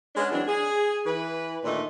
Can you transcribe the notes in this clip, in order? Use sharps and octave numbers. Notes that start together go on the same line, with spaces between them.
G#3 B3 C#4 D4
E3 F#3 C4 D4
G#4
E3 B4
A#2 D#3 A3 D4 D#4